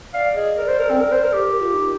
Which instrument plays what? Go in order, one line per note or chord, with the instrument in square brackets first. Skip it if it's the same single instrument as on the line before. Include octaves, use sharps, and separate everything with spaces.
[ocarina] D5 [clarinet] F5
[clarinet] G#4 [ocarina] D#5
[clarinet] A#4 [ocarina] D5
[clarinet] C5
A#4
C4
A#4
C5
A#4
G4
[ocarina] A#4
F4
D#4